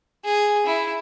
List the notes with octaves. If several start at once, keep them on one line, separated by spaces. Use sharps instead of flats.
G#4
E4